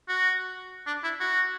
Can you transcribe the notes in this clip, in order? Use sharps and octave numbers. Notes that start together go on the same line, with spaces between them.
F#4
D4
E4
F#4